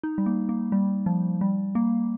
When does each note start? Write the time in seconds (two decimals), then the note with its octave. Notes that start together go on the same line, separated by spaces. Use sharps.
0.03 D#4
0.18 G3
0.26 A#3
0.49 A#3
0.72 G3
1.06 F3
1.41 G3
1.75 A#3